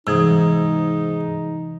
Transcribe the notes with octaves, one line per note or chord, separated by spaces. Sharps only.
G#2 C3 E3 D#4 D#6